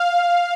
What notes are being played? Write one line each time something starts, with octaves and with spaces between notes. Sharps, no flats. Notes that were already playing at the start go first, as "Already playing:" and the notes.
Already playing: F5